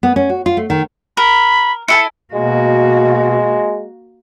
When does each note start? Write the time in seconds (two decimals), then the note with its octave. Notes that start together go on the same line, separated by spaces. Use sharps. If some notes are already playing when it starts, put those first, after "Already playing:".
0.03 B3
0.16 C#4
0.30 F#4
0.46 F4
0.57 A3
0.70 D#3
1.17 A#4 B5
1.88 E4 A4 G#5 C#7
2.34 B2 G#3 A#3 F#4